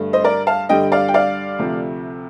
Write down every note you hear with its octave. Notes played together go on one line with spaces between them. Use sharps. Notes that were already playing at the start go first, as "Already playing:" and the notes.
Already playing: G2 D3 A3
C5 D#5
A#4 D5
F5 A5
G2 D3 G3 D#5 G5
D5 F5
G5
D5 F5
D2 C3 F3 A3